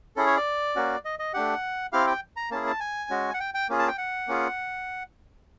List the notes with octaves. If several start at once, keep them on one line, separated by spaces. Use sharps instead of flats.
C#4 E4 G#4 A4
C#5
D5
A#3 C#4 F#4
D#5
D#5
A3 D4 G4 F#5
C4 E4 G4 F5
G5
A#5
A#3 C#4 E4 G#4 A5
A5
G#5
G#3 C#4 F#4
F#5
G5
G5
A#3 C#4 F4 G#4
A5
G5
F#5
A#3 C#4 F4 G#4